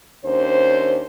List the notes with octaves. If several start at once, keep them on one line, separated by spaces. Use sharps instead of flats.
D#2 C#4 D4 C5